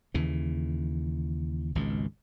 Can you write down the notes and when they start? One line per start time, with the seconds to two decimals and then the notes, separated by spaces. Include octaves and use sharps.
0.14 D#2 C#3 E3
1.75 G#1 C#2 B2